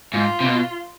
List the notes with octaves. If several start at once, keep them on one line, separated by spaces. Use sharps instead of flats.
G#2 F4
C3
B2